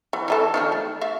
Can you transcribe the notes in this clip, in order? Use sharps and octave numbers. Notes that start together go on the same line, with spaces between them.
E3
E3 D#4 A4
D#3 F3 D4
A3
E5 F5